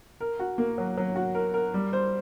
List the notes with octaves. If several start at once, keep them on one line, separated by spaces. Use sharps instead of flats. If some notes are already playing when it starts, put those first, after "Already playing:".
A#4
F#4
A#3
F#3
F#3
F#4
A#4
A#4
G3
C5